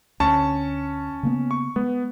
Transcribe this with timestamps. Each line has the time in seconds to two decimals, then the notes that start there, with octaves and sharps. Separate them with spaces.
0.20 D2 C#4 A5 C#6
1.23 C#3 A#3 B3
1.51 C#6
1.76 G#3 B3